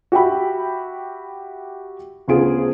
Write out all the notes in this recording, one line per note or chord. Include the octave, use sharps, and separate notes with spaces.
F#4 G4 E5 G5 B5
D2 C#3 B3 F4 G#4 D7